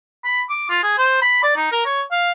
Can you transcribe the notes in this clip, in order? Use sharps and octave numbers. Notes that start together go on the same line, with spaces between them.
B5
D6
F4
G#4
C5
B5
D5
D#4
A#4
C#5
F5